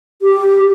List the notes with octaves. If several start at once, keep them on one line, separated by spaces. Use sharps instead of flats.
G4